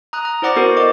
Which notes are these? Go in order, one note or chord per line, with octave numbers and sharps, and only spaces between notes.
A#5 D#6 F#6
A#5
E4 C5 D5 F#5 D6 A#6
B3 F#4 A4 A#4 C5
D5 D#5 D6